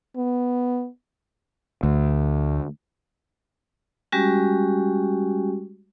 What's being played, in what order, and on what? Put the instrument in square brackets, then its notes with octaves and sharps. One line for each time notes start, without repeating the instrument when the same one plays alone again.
[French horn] B3
[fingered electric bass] D2
[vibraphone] G3 G#3 C#4 F#4 G4